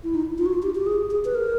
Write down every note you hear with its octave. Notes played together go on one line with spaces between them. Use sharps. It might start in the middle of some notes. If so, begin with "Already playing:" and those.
E4
D#4
F4
F#4
F4
G4
G4
G#4
G#4
B4
A#4